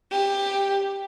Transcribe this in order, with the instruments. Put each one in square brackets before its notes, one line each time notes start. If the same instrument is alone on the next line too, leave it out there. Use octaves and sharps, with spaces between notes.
[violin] G4